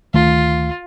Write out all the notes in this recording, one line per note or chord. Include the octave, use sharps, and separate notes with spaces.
D2 D#3 A3 F4